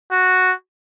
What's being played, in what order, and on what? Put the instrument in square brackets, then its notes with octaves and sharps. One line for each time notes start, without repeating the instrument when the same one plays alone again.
[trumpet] F#4